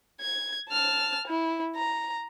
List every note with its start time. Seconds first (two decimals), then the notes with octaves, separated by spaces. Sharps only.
0.21 G#6
0.69 A5 F6
1.27 E4
1.76 A#5